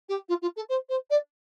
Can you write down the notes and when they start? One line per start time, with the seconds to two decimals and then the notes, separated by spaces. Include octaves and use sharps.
0.09 G4
0.29 F4
0.42 F4
0.56 A4
0.69 C5
0.89 C5
1.10 D5